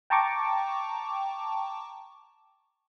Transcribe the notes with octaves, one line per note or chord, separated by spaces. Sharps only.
G5 A5 A#5 C#6 D6